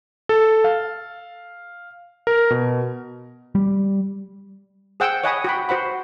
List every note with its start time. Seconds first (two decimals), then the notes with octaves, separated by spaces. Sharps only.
0.29 A4
0.64 F5
2.27 A#4
2.50 B2
3.55 G3
5.00 G#4 C5 F#5 G5 E6
5.24 C#5 D#5 F#5 G#5 B5 D#6
5.44 F#4 G5 B5
5.69 F#4 C5 F#5 B5